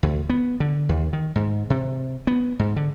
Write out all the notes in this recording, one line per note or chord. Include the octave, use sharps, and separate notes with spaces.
D2
B3
D3
D#2
D#3
G#2
C3
B3
G#2
D3